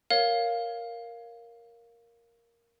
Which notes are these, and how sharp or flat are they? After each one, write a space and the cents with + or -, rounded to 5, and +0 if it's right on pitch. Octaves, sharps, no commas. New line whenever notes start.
A#4 +0 C#5 +0 F5 +0